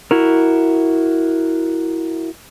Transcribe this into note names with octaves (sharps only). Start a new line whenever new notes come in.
E4 F#4 A#4